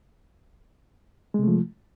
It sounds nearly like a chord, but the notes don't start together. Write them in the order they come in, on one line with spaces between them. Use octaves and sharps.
G#3 C3 A3 F3